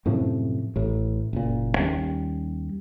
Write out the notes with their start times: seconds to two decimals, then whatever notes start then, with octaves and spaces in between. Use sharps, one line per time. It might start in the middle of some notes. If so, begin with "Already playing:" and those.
0.06 F#2 A2 C3 F3
0.76 A1 A2
1.33 F#1 A#2
1.78 D#2 G3 C#4